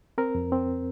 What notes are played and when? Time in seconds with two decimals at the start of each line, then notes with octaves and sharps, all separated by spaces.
0.18 C4 A#4
0.35 F2
0.52 C4